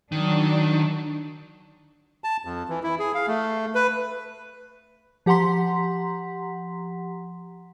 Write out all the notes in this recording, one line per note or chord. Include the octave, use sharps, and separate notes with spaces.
D#3 F#3 D4
A5
F2
E3
E4
G#4
F5
A3
B4
F3 G4 F#5 A#5 C6 B6